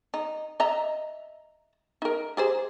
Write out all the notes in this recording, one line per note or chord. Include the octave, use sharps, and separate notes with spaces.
D#4
D#5 E5 A#5
D#4 A#4
G4 G#4 C5